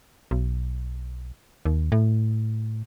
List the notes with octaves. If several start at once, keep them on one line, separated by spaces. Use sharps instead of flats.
B1
D#2
A2